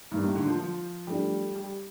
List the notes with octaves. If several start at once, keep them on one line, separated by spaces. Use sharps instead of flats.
G2 D#3 G3 A#3
A2
D3
F3
F3
F3 G3 A3 D4
G3